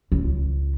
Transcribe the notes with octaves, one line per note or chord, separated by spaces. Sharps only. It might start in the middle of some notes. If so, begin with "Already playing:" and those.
C#2